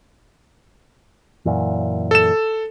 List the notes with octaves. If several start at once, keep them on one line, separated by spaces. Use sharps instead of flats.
F#2 A#2 E3
A4 E7